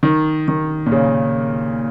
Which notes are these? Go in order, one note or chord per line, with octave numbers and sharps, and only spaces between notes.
D#3
D#3
A#2
C#3